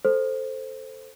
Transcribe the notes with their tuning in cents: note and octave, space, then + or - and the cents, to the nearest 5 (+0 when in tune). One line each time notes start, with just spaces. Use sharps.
A4 +0 C5 +0